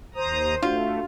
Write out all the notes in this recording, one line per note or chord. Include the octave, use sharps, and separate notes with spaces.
D#2 C5 A#5 D#6
A3 D4 F4 F#4